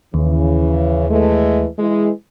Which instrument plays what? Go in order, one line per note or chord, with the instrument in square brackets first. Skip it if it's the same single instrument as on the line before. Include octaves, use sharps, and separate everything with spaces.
[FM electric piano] D#2 [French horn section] C#3 E3
[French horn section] E3 G#3 A3
E3 G#3